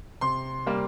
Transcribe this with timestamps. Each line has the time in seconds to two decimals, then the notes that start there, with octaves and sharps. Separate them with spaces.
0.21 C3 C6
0.66 G3 A#3